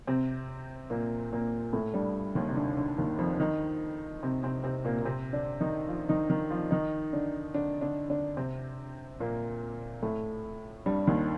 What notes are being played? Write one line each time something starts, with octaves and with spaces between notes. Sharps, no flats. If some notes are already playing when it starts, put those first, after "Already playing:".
C3 C4
A#2 A#3
A#2 A#3
A2 A3
G2 G3
D#2 D#3
C3
D3
D3
D#2 D#3
F2 F3
D#3 D#4
C3 C4
C3 C4
C3 C4
A#2 A#3
A#3
C3 C4
D3 D4
D#3 D#4
F3 F4
D#3 D#4
D#3 D#4
F3 F4
D#3 D#4
D3 D4
D3 D4
D3 D4
D3 D4
C3 C4
A#2 A#3
A2 A3
G2 G3
D#2 D#3